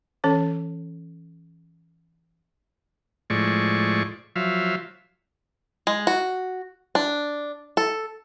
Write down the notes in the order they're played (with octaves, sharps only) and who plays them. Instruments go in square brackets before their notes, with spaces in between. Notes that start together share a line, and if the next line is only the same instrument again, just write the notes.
[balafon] E3 C#4 A4 C#5
[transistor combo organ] A2 F3 G#3 D5 C#6
F3 F#3 E5 F5
[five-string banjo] G#3
F#4
D4
A4